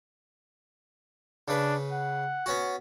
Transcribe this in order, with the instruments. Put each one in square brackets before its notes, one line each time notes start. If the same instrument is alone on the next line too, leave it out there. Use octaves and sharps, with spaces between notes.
[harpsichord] C#3 B4 [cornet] D4
[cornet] F#5
[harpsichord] B3 C#4 F#4